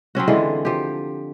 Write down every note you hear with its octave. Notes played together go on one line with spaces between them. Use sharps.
F#3 C4 C#4 F#4
D3 E3 G#3 F4
F3 G4